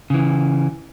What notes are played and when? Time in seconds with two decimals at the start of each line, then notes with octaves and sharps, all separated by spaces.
0.10 C#3 E3